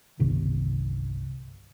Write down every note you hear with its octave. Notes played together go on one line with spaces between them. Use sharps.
G1 C2 C3 D#3